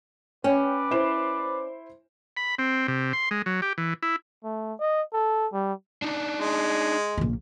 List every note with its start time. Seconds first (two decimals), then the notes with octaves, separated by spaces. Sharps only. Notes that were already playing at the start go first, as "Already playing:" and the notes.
0.44 C#4 B4 D5 G5
0.91 E4 C5 E7
2.37 B5
2.58 C4
2.88 C3
3.13 C6
3.31 G#3
3.46 F#3
3.62 G4
3.78 E3
4.03 E4
4.44 A3
4.79 D#5
5.13 A4
5.53 G3
6.02 D4 D#4 D5
6.39 G#3
7.18 A#1 A#3